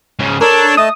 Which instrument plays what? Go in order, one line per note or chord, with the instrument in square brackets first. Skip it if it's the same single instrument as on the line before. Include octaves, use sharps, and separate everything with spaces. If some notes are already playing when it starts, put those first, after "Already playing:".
[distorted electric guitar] G#2 C#3
[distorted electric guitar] D4 [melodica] A4 C#5 A5 [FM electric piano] A#4
[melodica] A3 D#5 A5 [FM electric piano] D#6